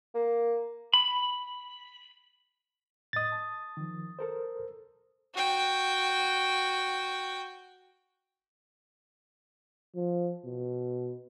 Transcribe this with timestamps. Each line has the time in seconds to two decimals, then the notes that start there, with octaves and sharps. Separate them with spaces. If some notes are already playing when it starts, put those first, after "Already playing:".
0.14 A#3
0.94 B5
3.13 A2 D#5 D#6 A6
3.32 A5
3.77 D#3 F3
4.19 A4 A#4 C5
5.34 F#4 G5
9.95 F3
10.45 B2